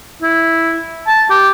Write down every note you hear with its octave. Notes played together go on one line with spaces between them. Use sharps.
E4
A5
G4